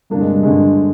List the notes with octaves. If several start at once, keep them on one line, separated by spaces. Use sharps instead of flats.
G2 D3 A#3 D4
G#3
G3
G2 D3 G#3